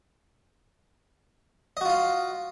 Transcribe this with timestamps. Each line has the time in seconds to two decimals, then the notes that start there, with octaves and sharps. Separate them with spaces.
1.77 D#5
1.81 F#4
1.85 F4
1.90 F5